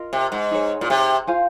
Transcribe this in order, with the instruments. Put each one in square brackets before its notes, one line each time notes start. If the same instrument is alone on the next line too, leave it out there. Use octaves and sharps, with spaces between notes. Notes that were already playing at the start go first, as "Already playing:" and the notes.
Already playing: [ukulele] F4 A#4 D#5
[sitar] C3
G#2
[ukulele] D#4 G#4 C#5
[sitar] A#2
C3
[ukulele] F4 C5 F5 G#5